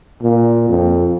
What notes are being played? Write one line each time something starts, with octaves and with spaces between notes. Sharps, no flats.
A#2
F2